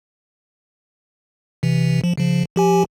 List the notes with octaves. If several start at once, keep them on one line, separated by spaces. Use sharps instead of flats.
C3 E3
F3
C#3 F3
F3 G4 G#5